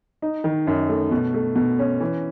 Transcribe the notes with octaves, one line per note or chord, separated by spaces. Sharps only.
D#4
D#3
F#2
A3
B2
A3
B2
C#4
E3